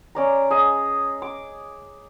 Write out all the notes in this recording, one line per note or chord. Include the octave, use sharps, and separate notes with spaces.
C#4 D5 A#5
G#4 D#5
D6